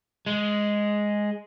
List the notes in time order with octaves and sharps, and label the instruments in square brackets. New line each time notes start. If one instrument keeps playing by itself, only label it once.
[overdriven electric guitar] G#3